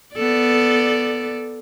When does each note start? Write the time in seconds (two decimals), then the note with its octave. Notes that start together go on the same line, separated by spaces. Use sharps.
0.15 B3 A4 D5